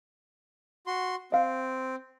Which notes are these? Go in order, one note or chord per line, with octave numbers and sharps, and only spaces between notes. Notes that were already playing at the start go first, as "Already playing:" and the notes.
F#4 C6
C4 D#5 F5